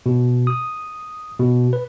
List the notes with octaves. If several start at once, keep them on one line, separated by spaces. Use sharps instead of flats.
B2
D#6
B2
B4